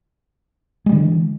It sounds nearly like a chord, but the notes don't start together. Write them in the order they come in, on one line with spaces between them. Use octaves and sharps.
G#3 G3 D3 E3